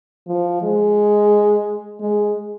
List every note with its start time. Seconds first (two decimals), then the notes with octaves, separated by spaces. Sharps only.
0.27 F3
0.62 G#3
2.00 G#3